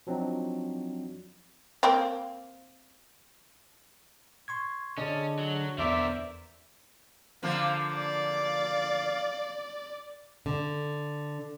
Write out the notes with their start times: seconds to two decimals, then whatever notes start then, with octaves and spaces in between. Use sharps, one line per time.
0.07 F3 F#3 C4 D4 D#4
1.83 A#3 C4
4.48 C6 C#6 G#6
4.98 D3 C#4 G#4 D5 D#5 A5
5.39 F#3
5.78 E2 D3 B3 A#4 C5 D5 E5
7.43 D3 F3 A#3 F5
7.95 D5 F5
10.46 D3